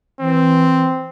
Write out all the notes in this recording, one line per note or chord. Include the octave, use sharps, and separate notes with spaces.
E3 C4